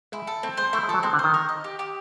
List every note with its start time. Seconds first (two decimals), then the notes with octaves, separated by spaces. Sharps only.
0.12 G#3 E4
0.27 A4
0.43 A3 C4
0.57 G#3 C5
0.73 A3 E4
0.83 G#3
0.89 F3 A4
0.94 F#3
1.03 G#3 C4
1.13 D3
1.19 C5
1.24 D#3
1.34 A#4
1.49 D#5
1.64 G4
1.79 G4